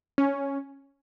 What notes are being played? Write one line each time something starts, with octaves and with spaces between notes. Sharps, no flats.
C#4